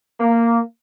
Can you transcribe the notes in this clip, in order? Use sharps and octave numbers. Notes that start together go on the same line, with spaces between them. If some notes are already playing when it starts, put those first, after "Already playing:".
A#3